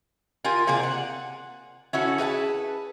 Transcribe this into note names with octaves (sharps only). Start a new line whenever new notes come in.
F4 G4 A#4 G#5
C3 A#3 G#4 D5
F#5
C#4 E4 F#4 A4
G#4 B4 F5 A5